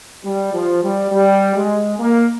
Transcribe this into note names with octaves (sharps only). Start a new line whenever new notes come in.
G3
F3
G3
G3
G#3
A#3